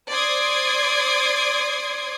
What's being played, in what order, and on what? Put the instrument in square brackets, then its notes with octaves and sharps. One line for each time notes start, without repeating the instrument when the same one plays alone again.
[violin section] C5 D5 C6 D6 D#6 G#6